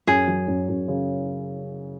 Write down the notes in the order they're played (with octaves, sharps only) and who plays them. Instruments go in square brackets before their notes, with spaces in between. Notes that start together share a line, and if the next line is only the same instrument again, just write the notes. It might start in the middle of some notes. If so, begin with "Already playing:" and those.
[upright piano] F#2 [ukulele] G#4
[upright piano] F#3
F#2
F#2
C#3